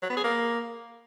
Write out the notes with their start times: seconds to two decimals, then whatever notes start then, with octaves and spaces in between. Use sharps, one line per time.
0.02 F#3
0.10 B3
0.17 G#4
0.24 A#3